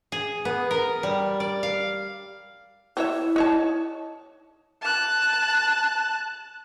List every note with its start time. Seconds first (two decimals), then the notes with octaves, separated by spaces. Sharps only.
0.12 G#4
0.45 B3
0.71 A#4
1.03 G3
1.40 D5
1.63 F5
2.97 C4 E4 C#5 E5
3.36 D#4 C#5 A5
4.82 A5 F#6